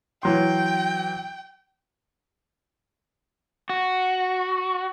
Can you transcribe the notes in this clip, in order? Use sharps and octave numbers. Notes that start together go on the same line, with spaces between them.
E3 F#3 G5 C6
F#4